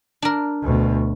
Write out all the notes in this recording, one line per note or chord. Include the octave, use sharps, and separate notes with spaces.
D4 A#4
D2 B2